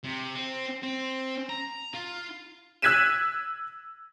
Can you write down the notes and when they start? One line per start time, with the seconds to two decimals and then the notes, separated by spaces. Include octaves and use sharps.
0.04 C3
0.35 C4
0.83 C4
1.49 A#5
1.94 F4
2.82 E6 F#6 G#6 B6 D#7 E7